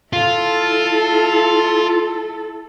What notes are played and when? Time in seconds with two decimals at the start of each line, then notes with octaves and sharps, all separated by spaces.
0.13 E4 F4 A4